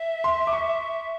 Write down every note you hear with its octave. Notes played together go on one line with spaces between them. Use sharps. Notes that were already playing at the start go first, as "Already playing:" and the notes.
Already playing: E5
C6
D6
C#6